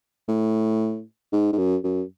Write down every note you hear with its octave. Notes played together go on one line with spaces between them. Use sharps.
A2
G#2
G#2
F#2
F#2